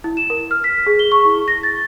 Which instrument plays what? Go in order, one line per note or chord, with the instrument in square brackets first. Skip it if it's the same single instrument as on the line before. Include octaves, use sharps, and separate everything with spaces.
[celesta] E4
E7
A#4
F6
B6
G#4
G7
C#6
E4
A#6
A6